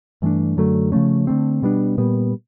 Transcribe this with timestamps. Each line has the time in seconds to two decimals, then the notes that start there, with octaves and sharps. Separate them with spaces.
0.22 G2 E3 A3 D4
0.57 F#2 D3 F#3 A3
0.92 C#3 F3 A3 C#4
1.27 D3 F#3 A3 C4
1.62 B2 G3 B3 D4
1.98 A#2 G3 B3